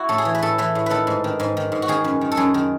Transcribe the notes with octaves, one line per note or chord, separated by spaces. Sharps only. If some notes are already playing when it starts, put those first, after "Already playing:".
Already playing: E4 F#4
A2 A4
G#4
E3
B4
A2 A4
E3 B4
A2
D#3 A4 B4
G#2
D#3
G#2
D#3
G#2
F#4
D#3 G#4
F#2
D#3
A4
F#2 G#4
D#3